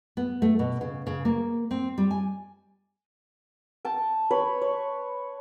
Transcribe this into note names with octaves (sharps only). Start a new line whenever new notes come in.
B3
A3
B2
C#3
C#3
A#3
C4
G3
G#5
G5 A5
B4 C#5 B5
C#5